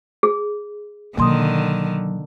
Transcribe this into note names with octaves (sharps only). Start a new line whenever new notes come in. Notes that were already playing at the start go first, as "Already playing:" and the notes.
G#4
B2 D3 D#3 F#3 A#3 C6 D#6